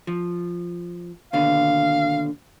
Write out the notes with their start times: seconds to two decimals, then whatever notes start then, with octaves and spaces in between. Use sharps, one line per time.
0.07 F3
1.33 D#2 B2 D3 F5